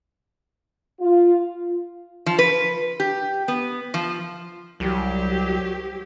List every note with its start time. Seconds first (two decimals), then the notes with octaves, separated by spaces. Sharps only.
1.00 F4
2.26 F3
2.39 B4
3.00 G4
3.48 B3
3.94 F3
4.80 C2 F#3 G4